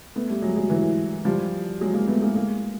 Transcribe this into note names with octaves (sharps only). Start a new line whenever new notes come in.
A3 B3
G3 A3
F#3 G#3
F#3 G#3
E3 F#3
F3 G3
F#3 G#3
G#3 A#3
A3 B3
G#3 A#3
G#3 A#3